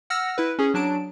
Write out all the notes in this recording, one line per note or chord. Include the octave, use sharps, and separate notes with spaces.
F#5 E6 F6 A#6
E4 B4
C#4 G#4
F#3 D4 A5 D7